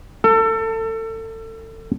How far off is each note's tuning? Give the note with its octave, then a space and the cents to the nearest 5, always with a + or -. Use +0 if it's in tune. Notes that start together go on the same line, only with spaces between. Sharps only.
A4 +30